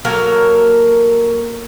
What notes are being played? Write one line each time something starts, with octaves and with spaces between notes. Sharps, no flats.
F#3 A#3 A4 A#4